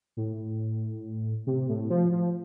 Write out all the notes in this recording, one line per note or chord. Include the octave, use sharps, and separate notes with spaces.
A2
C3
A2
F3
F3